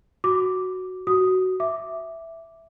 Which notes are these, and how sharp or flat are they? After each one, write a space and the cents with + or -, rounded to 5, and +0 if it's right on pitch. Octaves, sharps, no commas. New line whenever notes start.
F#4 +0 D6 +0
F#4 +10 D#6 +0
E5 +0 D6 +0